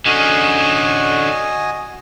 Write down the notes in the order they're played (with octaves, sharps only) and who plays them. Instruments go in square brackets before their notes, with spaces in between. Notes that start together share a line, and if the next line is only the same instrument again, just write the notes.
[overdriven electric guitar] D3 C#4 [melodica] F#4 D#5 G#5